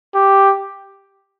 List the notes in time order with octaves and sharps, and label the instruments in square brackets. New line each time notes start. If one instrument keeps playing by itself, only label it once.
[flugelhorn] G4